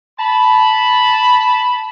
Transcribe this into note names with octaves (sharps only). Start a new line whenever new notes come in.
A5 B5